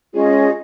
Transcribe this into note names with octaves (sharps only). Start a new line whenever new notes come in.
G#3 C#4 F4 G#4 D#5